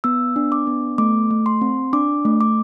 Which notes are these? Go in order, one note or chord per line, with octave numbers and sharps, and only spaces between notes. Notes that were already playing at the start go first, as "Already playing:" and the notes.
B3 E6
D4
D6
B3
A3 D6
A3
C6
C4
D4 D6
A3
D6